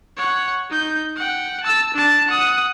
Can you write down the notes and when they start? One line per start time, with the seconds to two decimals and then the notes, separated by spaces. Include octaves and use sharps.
0.17 C#5 F#5
0.70 D#4 G6
1.16 F#5 G5
1.63 A5 E6
1.94 D4 A5
2.28 F#5 D#6